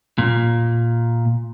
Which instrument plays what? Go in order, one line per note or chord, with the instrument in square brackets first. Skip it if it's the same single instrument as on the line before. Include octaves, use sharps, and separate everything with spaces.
[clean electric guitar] A#2